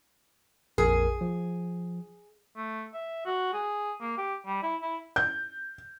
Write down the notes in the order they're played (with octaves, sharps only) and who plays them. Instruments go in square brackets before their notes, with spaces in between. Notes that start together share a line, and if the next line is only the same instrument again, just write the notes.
[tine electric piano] A#1 F2 A#4 [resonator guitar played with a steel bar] G#4
[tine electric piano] F3
[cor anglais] A3
E5
F#4
G#4
A#3
G4
G3
E4
E4
[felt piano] G6